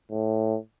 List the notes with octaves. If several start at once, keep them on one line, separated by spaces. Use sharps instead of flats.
A2